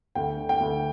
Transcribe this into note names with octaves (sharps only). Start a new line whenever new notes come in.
D2 G5
D3
G5
D2